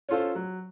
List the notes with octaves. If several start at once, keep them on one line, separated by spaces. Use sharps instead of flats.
C#4 F4 A4 C5
F#3